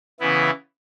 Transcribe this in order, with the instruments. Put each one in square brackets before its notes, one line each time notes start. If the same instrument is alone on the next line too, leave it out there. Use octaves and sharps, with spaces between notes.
[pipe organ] C#3 E3 B3 E4